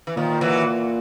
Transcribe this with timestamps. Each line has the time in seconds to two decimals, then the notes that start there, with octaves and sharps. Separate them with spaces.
0.07 E3
0.16 A#2 D#3 F3
0.41 E3 F#3